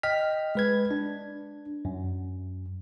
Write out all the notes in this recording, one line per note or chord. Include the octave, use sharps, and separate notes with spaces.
D#5 G5 F6 B6
G#3 B4 G#6
D4
F#2